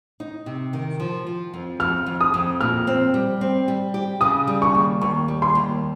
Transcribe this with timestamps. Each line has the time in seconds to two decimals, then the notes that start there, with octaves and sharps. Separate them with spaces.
0.20 D#4
0.46 C3
0.73 D#3
1.00 F3
1.27 F3
1.54 F2
1.80 F2 F6
2.06 F2
2.21 D#6
2.34 F2
2.61 A#2 F6
2.87 C4
3.14 G3
3.41 C4
3.68 G3
3.94 G4
4.21 C#3 D#6
4.47 G3
4.62 C#6
4.75 D#2
5.01 D#2 C#6
5.28 G3
5.42 C6
5.55 D#2